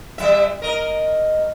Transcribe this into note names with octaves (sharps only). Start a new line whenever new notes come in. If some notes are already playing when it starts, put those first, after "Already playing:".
G3 E5
A#4 D#5